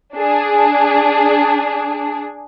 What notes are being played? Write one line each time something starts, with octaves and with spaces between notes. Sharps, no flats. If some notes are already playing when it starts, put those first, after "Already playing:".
D4 G#4